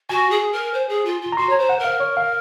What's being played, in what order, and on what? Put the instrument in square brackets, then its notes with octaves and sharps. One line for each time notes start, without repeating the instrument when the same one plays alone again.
[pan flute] F#4 [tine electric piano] G#5
[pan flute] G#4
A#4
C5
G#4
F4
F4
[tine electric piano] A#5
[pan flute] F#4 [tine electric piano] C6
[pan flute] C#5 [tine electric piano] A#5
[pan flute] C5
[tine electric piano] F#5
[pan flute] A#4 [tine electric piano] F5
[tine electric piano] C#5
F5